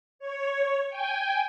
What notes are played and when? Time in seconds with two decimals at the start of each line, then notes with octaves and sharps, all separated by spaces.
0.19 C#5
0.89 G5 G#5